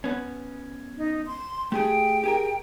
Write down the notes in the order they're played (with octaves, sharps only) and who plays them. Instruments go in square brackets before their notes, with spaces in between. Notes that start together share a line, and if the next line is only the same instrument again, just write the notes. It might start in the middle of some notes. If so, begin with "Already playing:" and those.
[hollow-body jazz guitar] B3 C#4
[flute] D#4
C6
[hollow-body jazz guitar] A3 G4 G#4 [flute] G5
[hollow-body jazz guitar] G4 G#4 A#4